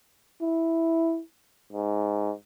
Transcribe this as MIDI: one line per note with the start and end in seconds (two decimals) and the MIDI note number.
0.41 1.20 64
1.73 2.32 44